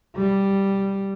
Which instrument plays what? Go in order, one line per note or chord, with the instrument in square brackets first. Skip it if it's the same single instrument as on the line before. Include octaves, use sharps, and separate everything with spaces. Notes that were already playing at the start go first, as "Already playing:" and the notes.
[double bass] G3